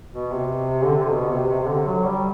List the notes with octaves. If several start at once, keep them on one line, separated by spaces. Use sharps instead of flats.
B2
C3
D3
C3
B2
C3
C3
C3
D3
F#3
G3